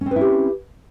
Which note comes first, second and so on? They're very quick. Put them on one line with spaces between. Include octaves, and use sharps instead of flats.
C#4 C4 B4 E4 G4